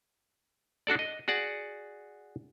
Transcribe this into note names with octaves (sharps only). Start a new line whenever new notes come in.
D4 F#4 A4 D5
D#5
F#4 G#4 D5 F#5